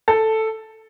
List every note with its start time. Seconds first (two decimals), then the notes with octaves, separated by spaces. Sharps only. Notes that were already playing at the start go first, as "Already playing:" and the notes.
0.08 A4